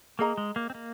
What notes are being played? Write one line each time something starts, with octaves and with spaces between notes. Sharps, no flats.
A#3 G#4 D#5 A#5
G#3
A#3
C4
A#3